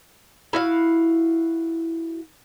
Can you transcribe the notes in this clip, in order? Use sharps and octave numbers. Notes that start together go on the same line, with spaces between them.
E4 F#4 F5